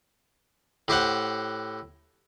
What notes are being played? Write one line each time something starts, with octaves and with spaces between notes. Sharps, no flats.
A2 G4 C5 F#5